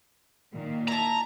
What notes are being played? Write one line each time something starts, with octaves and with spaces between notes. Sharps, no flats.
A#2 D#3
E4 A5 A#5